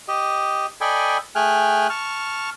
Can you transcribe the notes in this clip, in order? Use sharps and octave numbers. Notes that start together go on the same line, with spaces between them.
G4 D#5
A4 D5 D#5 G5 G#5 B5
A3 G#4 G5 G#5 F6 F#6
A5 C#6 F6